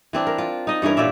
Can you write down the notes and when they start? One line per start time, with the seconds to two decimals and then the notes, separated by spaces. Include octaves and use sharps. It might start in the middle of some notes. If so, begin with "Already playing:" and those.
0.13 E3 C4 D4
0.27 A#4
0.38 F4
0.67 D#4 D#5
0.82 G2 E3 C#4 A#4
0.97 A#2 F4 D5 E5